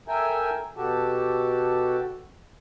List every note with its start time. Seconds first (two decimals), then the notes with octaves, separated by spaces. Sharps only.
0.08 A4 A#4 E5 G5 G#5
0.77 B2 F#4 G4 A4 A5